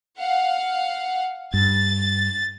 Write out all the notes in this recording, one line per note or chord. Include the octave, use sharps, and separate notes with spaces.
F5 F#5
G2 A6